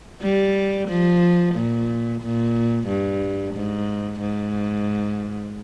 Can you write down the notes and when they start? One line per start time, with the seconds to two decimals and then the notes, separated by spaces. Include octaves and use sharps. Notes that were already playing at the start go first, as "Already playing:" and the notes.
0.22 G3
0.89 F3
1.55 A#2
2.22 A#2
2.88 G2
3.55 G#2
4.20 G#2